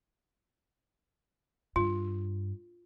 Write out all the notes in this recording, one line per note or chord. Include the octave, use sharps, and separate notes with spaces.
G2 F4